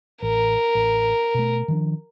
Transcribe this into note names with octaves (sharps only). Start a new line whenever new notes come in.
A1 A#4
A1
B2 A3
D#3 F3 D4